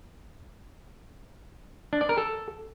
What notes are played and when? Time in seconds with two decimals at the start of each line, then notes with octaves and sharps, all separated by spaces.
1.93 D4
2.01 D5
2.09 A#4
2.18 A4